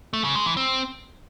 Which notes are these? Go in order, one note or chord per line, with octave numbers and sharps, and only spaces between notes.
A3
C#3
G#3
E3
C4